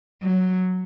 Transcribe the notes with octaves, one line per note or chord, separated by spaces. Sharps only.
F#3